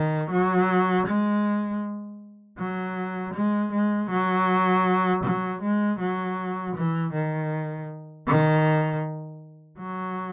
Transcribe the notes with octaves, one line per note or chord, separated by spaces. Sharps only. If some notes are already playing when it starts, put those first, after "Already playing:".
Already playing: D#3
F#3
G#3
F#3
G#3
G#3
F#3
F#3
G#3
F#3
E3
D#3
D#3
F#3